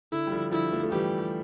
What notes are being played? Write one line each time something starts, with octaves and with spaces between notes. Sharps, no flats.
D3 E4
G3
D3 F3
D3 F3 E4
F3 A3
A3
E3 G3 G4